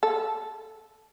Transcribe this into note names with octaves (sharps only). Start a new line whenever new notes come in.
A4